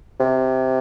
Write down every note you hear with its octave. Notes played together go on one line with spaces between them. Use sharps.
C3